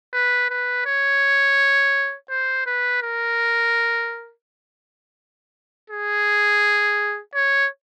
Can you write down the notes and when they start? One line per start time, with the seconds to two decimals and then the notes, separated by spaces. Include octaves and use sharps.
0.13 B4
0.49 B4
0.86 C#5
2.30 C5
2.66 B4
3.03 A#4
5.90 G#4
7.34 C#5